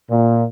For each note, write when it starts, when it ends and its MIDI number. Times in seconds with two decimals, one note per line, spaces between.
0.10 0.45 46